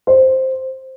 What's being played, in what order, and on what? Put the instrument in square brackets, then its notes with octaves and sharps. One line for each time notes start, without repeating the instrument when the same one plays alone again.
[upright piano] C5